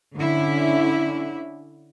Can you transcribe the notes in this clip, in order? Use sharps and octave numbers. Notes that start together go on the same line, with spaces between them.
D3 C#4 E4